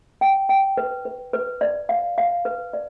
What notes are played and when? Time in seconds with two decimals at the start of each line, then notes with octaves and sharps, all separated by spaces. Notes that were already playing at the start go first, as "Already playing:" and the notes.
0.21 G5
0.49 G5
0.77 B4
1.05 B4
1.33 B4
1.61 D5
1.89 F5
2.18 F5
2.45 B4
2.73 D5